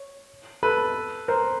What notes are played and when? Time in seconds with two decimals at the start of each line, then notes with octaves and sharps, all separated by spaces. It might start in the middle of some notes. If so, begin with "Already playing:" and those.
Already playing: C#5
0.63 A4 B4
1.28 A#4 C5